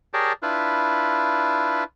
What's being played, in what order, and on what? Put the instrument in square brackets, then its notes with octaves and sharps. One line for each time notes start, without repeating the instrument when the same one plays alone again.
[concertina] G4 G#4 A#4 C#5 D5 A5
D4 E4 F4 B4